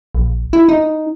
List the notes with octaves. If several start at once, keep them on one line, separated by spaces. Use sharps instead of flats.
A#1
E4
D#4